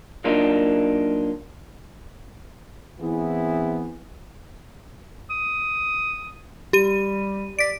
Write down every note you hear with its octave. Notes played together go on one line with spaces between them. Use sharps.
F#3 A#3 D4 D#4 F4
E3 B3 C4 E4 G#4
D#6
G3 G4 D#7
D5 B6 D7